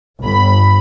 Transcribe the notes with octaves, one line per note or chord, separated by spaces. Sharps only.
G1 B5